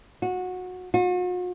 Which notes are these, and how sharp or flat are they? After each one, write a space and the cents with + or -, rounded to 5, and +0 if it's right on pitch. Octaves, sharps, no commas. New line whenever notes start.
F#4 -20
F#4 -45